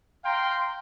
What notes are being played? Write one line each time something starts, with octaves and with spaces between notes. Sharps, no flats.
F5 G5 A#5 C6